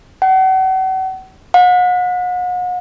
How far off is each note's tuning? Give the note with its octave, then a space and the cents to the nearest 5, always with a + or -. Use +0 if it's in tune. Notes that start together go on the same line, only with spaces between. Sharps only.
F#5 +40
F#5 -40